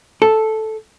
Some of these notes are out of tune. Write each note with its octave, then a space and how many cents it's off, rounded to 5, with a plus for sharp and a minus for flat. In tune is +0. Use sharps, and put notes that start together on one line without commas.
A4 -5